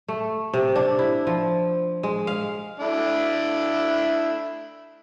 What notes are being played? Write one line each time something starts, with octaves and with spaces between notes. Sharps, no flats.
A3
C3
D4
E4
F3
G#3
F5
A3 D4 E4